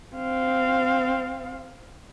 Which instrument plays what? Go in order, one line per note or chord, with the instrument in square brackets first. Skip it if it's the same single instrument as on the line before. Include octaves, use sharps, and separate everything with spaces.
[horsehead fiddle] C4 F5